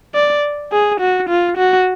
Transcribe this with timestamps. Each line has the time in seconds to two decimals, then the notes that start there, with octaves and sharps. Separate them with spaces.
0.15 D5
0.72 G#4
1.00 F#4
1.29 F4
1.57 F#4